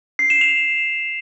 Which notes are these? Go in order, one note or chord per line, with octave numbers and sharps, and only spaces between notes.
C7
E7
F7